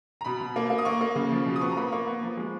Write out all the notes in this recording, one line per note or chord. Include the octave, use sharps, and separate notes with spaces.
A#5
B2 B5
B2
A#3
A#3
D#6
A#3 C#6
A#3
C#3
F3
B2
D#6
B3 C#6
A#5
A#3 B5
A#3 C#6
B3
F3
G#3